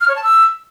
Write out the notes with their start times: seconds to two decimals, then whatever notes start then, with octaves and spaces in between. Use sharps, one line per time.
0.01 F6
0.08 C#5
0.16 A5
0.23 E6